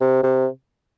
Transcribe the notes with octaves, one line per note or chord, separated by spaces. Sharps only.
C3
C3